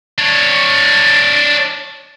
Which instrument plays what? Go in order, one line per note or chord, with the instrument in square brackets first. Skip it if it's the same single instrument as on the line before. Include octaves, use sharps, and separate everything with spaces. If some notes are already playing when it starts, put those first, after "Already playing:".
[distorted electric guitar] D4 C#5